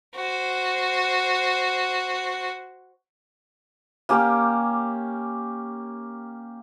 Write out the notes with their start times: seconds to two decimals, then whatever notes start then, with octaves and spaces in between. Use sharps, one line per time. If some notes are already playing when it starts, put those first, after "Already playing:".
0.15 F#4 C5
4.09 A#3 C#4 G4